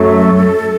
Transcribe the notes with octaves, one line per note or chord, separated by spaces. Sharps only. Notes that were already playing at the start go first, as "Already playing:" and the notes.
Already playing: F#2 F#3 A3 A4